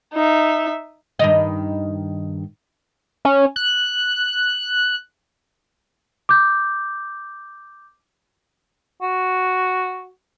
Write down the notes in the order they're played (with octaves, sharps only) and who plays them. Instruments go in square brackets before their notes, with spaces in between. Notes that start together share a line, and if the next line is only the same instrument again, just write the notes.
[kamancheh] D#4 E5
[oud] G2 D#3 D#5
[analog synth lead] C#4
F#6
[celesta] D6 G6
[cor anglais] F#4